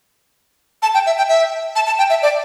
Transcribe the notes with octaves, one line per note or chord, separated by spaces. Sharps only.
A5
G5
E5
G5
E5
A5
A5
G5
E5
D5